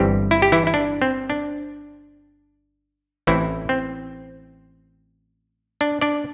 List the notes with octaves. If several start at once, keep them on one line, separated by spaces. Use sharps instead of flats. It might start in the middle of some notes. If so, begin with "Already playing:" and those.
Already playing: G1 G2 E3 G3 C4 G4
E4
G4
E3 E4
E4
D4
C4
D4
A1 A2 E3 C4 E4
C4
D4
D4 D5